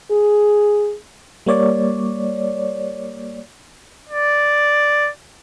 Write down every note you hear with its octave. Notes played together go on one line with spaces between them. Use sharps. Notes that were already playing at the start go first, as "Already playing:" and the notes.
G#4
G3 A#3 C#5 D5
D5